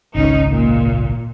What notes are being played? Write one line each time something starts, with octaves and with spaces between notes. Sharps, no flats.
G#1 C#2 C#4 D#4
A#2